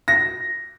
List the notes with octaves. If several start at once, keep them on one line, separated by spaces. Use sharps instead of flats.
A#6